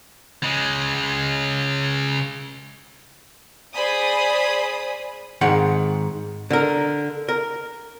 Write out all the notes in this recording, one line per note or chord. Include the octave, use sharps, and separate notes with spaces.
C#3 G#3
G#4 C5 D5 G#5 B5 D#6
G#2 D#3 F#5
D3 A#4
A#4